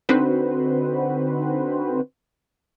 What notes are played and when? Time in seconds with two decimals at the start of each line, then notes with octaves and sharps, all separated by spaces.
0.09 D3 C4 D#4 F#4 B4 C5